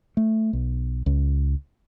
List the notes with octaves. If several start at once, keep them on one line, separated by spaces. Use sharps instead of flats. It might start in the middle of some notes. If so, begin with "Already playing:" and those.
A3
B1
C#2